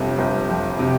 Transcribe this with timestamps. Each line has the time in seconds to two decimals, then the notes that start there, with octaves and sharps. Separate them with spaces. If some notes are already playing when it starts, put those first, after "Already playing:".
Already playing: G1 F2 C3
0.18 G1
0.49 F2
0.79 C3